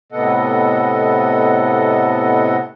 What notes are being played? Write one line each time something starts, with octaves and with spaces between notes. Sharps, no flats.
A2 C3 B3 A4 D#5 F#5